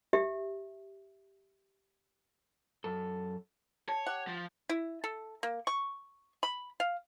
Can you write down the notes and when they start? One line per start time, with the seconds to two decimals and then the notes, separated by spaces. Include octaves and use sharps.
0.13 G4 E5
2.84 F#2 A4
3.89 C#5 A5
4.06 G4 F#5
4.27 F3
4.69 E4
5.04 A4
5.43 A#3
5.67 C#6
6.43 B5
6.80 F5